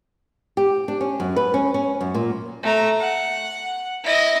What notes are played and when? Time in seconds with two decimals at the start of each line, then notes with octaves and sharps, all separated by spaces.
0.57 G4
0.88 D4
1.01 C#4
1.20 F#2
1.36 B4
1.54 C#4
1.74 C#4
2.01 F#2
2.14 A#2
2.63 A3 A#5
2.99 F#5
4.04 E4 D#5